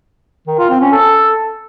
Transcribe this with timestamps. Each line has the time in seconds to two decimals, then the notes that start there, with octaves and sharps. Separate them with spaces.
0.47 D#3
0.59 F4
0.70 C4
0.81 C#4
0.92 A4